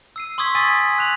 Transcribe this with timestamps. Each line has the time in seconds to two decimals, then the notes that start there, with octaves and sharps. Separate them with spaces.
0.16 E6 C7 D#7
0.38 C6 C#6 D#6 E6 G#6 B6
0.55 G#5 D#6 A6 B6 D#7
0.98 F#6 F7 F#7